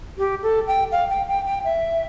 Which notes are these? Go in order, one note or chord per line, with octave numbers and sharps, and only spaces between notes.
G4
A4
G5
F5
G5
G5
G5
E5